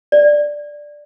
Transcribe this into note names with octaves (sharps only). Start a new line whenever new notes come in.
D5